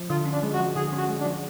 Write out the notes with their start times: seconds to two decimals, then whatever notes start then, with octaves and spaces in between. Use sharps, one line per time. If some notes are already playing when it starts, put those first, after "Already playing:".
Already playing: F3
0.10 D3 F4
0.25 C#4
0.32 D4
0.43 G#3
0.53 F#4
0.59 F3
0.75 D3 G#4
0.92 C#4 F#4
1.08 G#3
1.20 D4
1.25 F3